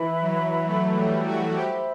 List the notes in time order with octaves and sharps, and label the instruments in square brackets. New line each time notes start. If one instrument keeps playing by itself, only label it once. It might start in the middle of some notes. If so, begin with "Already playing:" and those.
Already playing: [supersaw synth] E3 [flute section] B4 E5 B5
[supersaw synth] F#3
A3
G3
F#4
[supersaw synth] G4 [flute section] C5 E5 B5